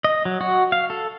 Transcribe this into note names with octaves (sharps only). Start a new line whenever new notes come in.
D#5
F#3
F#4
F5
A4